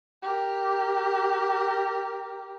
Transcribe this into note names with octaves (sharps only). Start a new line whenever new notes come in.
G4 A#4